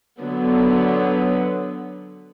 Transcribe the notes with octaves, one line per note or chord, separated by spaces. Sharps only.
D3 F#3 B3